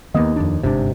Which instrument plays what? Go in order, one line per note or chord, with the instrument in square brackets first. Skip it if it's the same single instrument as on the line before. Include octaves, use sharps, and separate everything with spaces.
[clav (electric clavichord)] D#2 D#5 [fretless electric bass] D#3 A#3 B3
[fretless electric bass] F2 D4
[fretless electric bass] G1 G#2 D4 [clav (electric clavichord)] C3